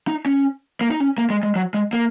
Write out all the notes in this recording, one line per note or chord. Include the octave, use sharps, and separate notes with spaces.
D#4
C#4
A#3
D#4
C#4
A#3
G#3
G#3
F#3
G#3
A#3